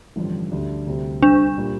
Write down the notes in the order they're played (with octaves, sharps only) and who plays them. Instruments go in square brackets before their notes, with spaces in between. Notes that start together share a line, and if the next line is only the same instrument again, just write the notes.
[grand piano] A1 G2 D3 F3
D2 D3 G3 D4
D2 C3 G3 C4
[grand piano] C2 C3 G3 [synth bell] D4
[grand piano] A#2 G3